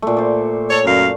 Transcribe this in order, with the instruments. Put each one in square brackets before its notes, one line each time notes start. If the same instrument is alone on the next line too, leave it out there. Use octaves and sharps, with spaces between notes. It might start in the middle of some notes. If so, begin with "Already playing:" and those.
[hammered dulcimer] A#2 A3
C5 D5
[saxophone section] A4 C#5
F#2 A#4 F5